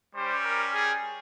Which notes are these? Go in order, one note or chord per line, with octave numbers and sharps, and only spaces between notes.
G3 C#4 G4 C5
A#4
G#4